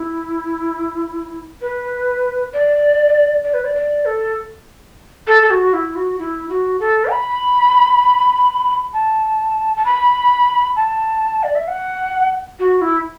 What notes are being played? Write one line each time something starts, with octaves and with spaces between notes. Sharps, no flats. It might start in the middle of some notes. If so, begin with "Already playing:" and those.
Already playing: E4
B4
D5
D5
B4
D5
D5
A4
A4
A4
F#4
E4
F#4
E4
F#4
A4
B5
A5
A5
B5
A5
D5
E5
F#5
F#4
E4